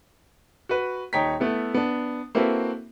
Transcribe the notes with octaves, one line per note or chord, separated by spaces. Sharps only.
F#4 B4
D#1 D#4 C#5 G5 A#5 B6
A3 B3 E4
B3 D4
A#3 C4 E4 F#4 A4 B4